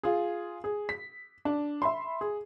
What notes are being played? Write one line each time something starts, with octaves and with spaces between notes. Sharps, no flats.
F4 G#4
G#4
B6
D4
E5 B5 C6
G#4